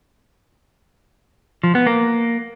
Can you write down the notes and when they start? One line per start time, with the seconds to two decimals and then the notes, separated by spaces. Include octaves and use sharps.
1.64 F3
1.75 B3
1.86 A#3